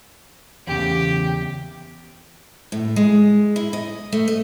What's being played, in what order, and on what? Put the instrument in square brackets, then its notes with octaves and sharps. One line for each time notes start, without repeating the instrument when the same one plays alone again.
[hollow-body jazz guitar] E2 C#3 [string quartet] G4 G5
[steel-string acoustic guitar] A2
G#3
E4
D#5
A3
D#5